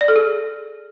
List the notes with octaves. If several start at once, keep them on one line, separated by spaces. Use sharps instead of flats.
D5
A4
G#4